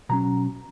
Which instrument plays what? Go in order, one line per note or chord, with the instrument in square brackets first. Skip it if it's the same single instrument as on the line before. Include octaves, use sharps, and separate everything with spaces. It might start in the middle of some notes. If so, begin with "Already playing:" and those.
[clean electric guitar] B2 F#3 C#4 A#5